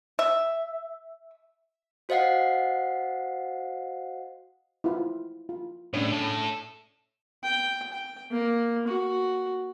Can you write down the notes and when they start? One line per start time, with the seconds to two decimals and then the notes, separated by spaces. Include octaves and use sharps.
0.19 E5
2.09 F#4 C5 D#5 F5 F#5 C7
4.84 E4 F4
5.49 F4
5.94 A2 C#4 D4 C#5
6.12 A2 A4
7.43 G5
7.93 G5
8.31 A#3
8.87 F#4